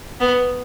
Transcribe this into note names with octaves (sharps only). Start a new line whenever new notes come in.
B3